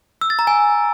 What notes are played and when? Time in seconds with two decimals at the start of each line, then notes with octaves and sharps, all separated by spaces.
0.21 E6
0.30 A6
0.39 A#5
0.47 G#5